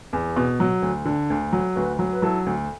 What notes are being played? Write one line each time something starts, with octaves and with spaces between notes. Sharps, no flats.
E2
B2
F#3
D2
D3
D2
F#3
D2 F#4 B4
F#3
B4
F#3 E4 A4
D2